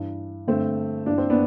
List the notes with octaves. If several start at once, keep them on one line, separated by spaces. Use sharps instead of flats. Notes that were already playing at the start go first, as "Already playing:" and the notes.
Already playing: G2 E3
G2 D3 A3 C4
G2 E3 D4
C4
B3 D4